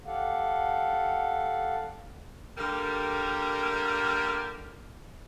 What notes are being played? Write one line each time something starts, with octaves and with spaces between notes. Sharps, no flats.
G4 A4 D5 F5 F#5
D3 G3 A#3 G4 A#4